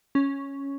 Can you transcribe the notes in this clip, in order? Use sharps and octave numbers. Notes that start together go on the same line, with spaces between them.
C#4